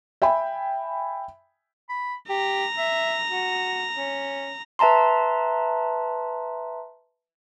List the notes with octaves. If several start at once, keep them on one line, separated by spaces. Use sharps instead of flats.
E5 G5 G#5 B5
B5
G4 A#5
E5
F#4
C#4
B4 E5 A5 A#5 C6